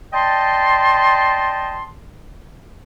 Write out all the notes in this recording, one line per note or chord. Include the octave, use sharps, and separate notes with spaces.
D5 D#5 G5 A5 C6